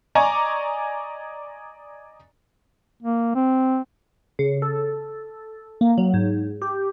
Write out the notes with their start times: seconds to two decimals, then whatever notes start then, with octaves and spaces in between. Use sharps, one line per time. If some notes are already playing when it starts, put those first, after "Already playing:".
0.15 D5 D#5 G#5 A#5 C#6 D6
3.03 A#3
3.35 C4
4.39 C#3
4.62 A4
5.81 A#3
5.98 F#3
6.14 G#2
6.62 G4